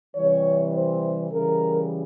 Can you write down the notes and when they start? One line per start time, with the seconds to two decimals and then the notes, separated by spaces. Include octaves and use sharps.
0.15 C3 E3 G3 C#5
0.73 C5
1.30 C#3 E3 G3 A#4